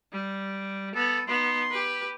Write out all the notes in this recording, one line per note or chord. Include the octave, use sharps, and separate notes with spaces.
G3
B3 A4
B3 D#4 C6
G4 B4